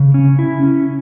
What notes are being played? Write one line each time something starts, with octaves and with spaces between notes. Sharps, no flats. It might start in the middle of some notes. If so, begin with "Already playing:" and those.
Already playing: C#3
C#4
E4
C#4